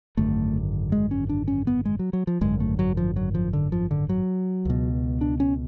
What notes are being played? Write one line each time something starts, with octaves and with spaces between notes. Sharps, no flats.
G#1 F#2 D3 A3
G#3
C#4
D4
C#4
B3
G#3
F#3
F#3
F3
G#1 F#2 D3 G#3
A3
F#3
F3
F#3
F3
D3
F3
D3
F#3
C#2 B2
D4
C#4